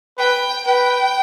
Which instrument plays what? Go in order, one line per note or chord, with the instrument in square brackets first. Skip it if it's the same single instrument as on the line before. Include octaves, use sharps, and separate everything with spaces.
[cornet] B4 [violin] G5
[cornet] B4 [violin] G5